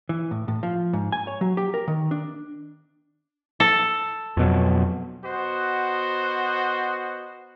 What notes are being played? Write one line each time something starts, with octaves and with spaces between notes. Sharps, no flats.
E3
A2
A2
F3
G#2
G#5
C#5
F#3
G4
A#4
D#3
D4
A4
F2 B2 F#3
B3 F#4 C5 D#5 F#5